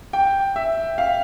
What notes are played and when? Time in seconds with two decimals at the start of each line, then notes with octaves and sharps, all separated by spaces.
0.13 G5
0.56 E5
0.98 F5